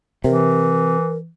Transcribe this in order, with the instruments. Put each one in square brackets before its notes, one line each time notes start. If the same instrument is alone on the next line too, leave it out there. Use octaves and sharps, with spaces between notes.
[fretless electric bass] C3 [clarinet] E3 [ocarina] A#4